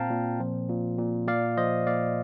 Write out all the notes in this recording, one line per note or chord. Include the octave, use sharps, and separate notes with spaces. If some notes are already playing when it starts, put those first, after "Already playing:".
Already playing: A#2 C4 F5 G5 A5 A#5
A#2
F3
A#2
A#2
A#2 D5 F5
F3 C5 D#5
A#2 D5 F5